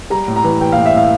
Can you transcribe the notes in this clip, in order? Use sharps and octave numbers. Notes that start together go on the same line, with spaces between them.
G3 A#5
A2
A#5
E3
E3 G5
A2 F5
E5
A2 F5